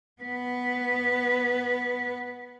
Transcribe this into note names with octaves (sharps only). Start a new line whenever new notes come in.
B3 B4